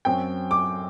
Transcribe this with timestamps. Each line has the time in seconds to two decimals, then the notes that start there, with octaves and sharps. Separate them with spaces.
0.05 F#2 F#3 C4 G5
0.51 D6